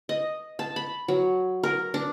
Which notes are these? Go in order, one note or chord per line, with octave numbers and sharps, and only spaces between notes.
D#5
A5
B5
F#3
A#4
D4